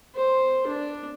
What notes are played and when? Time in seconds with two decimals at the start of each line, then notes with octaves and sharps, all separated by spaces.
0.15 C5
0.67 D4